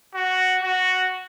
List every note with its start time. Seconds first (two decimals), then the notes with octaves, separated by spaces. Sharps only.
0.15 F#4
0.63 F#4